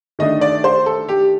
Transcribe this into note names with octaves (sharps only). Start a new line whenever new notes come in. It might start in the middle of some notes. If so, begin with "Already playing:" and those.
D#3 A3 D4 D#5
D5
C5
A4
G4